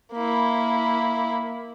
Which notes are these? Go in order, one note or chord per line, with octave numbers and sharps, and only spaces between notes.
A#3 E4